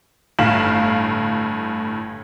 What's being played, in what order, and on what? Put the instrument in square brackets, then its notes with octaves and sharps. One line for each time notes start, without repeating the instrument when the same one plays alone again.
[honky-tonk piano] G1 A2 F5 E7 F#7